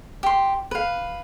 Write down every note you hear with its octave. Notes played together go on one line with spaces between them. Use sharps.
G4 C6
B4 F5